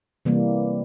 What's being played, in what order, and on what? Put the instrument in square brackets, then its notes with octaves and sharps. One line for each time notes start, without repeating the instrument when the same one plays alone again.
[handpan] C3 E3 G3 A#3